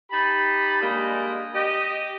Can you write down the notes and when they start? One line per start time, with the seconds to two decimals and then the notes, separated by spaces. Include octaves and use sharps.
0.12 D#4 G4 A5 B5
0.81 G3 G#3 A#3 D4 D#5
1.54 G4 D#5